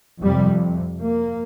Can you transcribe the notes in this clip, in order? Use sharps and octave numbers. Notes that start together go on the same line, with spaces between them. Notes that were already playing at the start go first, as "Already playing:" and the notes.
F2 C3 G3
A#3